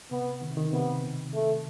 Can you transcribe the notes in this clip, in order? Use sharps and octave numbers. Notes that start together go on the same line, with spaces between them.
C3 B3
D#3
C3
D#3
C3 B3
B2
A3